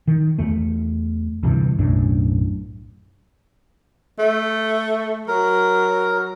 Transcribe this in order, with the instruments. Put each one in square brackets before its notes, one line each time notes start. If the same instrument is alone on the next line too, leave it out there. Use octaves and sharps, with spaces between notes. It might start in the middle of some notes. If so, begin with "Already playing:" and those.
[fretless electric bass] D#3
E2 A3
D2 G2 C3 E3
B1 F#2 A2 D4
[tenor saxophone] A3
[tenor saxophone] F#3 [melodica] A#4